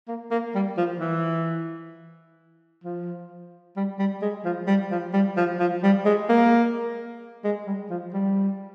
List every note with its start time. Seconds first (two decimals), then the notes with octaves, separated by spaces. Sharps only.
0.08 A#3
0.31 A#3
0.55 G3
0.77 F3
1.00 E3
2.84 F3
3.76 G3
3.99 G3
4.22 G#3
4.45 F3
4.67 G3
4.91 F3
5.13 G3
5.37 F3
5.60 F3
5.83 G3
6.06 G#3
6.29 A#3
7.44 G#3
7.66 G3
7.90 F3
8.13 G3